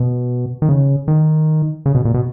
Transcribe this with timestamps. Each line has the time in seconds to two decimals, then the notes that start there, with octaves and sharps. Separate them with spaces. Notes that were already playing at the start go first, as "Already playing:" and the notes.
Already playing: B2
0.62 D#3
0.69 C#3
1.08 D#3
1.86 C#3
1.95 B2
2.05 A#2
2.14 B2